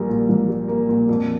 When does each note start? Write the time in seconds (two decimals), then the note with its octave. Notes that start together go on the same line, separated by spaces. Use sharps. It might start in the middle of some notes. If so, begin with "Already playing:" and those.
Already playing: A#1 G3 A#3
0.09 A#2
0.29 A#1
0.49 G3
0.68 A#3
0.89 A#2
1.09 F2